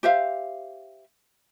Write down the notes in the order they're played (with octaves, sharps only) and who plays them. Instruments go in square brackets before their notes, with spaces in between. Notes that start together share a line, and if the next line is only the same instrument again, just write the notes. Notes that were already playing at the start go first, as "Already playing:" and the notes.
[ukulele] G4 C5 E5 F5